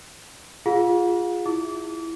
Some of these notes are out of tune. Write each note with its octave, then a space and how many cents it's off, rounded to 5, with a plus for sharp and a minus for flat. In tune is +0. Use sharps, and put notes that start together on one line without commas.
F4 +0 G#4 -15 F5 +45
E4 +0 D6 -35